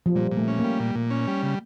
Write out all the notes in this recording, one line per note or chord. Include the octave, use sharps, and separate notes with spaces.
F3
A#2 G3
A#2
A3
C#4
A#3
G3
A#2
A#2
C#4
G3
C#3